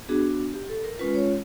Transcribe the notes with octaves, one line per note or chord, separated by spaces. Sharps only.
B3 D4 F#4 G#4
G4
A4
A#4
G#3 C#4 F4 B4
C#5